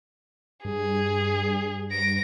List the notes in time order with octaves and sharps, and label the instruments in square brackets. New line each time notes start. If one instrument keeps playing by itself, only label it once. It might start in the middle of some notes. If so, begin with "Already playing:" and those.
[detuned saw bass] G2 [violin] G#4
[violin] A#6 D7